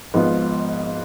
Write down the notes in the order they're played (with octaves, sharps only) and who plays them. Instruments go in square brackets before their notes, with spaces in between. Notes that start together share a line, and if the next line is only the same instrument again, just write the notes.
[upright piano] G#1 G#2 F3 B3 F4